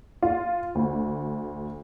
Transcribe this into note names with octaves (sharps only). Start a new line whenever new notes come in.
F4
D2